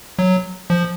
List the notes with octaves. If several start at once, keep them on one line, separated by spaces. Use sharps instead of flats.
F#3
F3